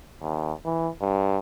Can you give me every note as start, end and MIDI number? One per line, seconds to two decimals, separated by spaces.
0.22 0.52 39
0.65 0.89 52
1.01 1.39 43